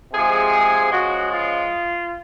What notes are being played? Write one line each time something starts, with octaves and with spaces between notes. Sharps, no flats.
C3 F3 G#3 G#4
C#3 F3 G#3 F#4
F4